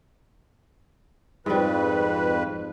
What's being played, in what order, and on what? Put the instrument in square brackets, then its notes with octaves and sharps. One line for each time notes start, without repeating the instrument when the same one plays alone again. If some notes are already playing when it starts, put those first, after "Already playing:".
[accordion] F2 B4 [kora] G#2 G3